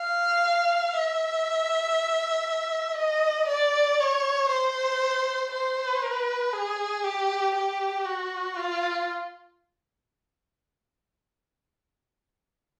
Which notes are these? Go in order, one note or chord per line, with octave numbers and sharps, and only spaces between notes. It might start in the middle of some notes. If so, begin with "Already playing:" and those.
Already playing: F5
E5
D#5
D5
C#5
C5
C5
B4
G#4
G4
G4
F#4
F4